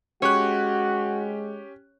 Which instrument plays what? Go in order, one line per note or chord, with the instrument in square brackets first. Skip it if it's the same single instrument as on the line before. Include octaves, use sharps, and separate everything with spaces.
[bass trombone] G#3 [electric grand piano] C#4 G4 F#6 [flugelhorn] F#4 [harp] C#5